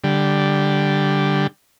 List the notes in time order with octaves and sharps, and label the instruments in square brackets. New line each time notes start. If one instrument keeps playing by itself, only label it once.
[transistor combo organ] D3 G3